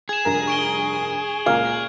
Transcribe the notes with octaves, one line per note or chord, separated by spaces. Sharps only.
G#4 G#6 E7
F1 G2 A#4
C#6 D7 G7
C#2 A#2 A#4 F5 G#6